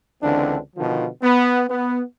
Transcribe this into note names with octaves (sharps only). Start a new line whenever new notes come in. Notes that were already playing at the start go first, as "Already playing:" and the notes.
C#2 D3 E3 C4 D4
B2 D3 D#3 F3
B3
B3